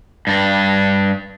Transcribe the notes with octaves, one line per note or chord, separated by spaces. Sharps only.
G2 D4